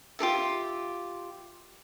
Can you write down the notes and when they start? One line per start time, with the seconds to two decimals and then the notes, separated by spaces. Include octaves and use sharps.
0.19 F4 G4 A4 E5